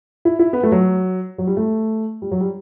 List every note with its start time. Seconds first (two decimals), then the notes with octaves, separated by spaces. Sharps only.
0.25 E4
0.39 E4
0.53 B3
0.63 A3
0.72 F#3
1.38 F#3
1.47 G3
1.57 A3
2.22 G3
2.31 F#3
2.41 G3